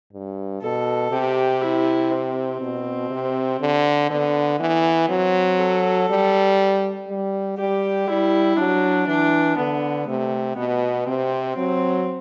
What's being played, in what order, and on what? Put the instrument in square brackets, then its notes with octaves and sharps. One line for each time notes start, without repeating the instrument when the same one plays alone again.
[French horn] G2
[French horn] B2 [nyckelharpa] A4
[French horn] C3 [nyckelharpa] G4
[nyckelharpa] E4
C4
[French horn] B2
C3
D3
[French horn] D3 [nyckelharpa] B3
[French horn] E3 [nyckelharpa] B3
[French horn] F#3 [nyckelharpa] C4
[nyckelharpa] A4
[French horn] G3
G3
[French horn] G3 [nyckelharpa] G4
[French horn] G3 [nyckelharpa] E4
[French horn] F#3 [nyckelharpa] D4
[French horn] E3 [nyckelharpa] D4
[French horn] D3 [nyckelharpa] B3
[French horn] C3 [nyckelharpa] A3
[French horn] B2 [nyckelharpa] B3
[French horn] C3 [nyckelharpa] C4
[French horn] F#3 [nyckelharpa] C4